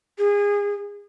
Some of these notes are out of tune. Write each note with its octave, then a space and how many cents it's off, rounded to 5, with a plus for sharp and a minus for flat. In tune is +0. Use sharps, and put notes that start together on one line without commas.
G#4 -30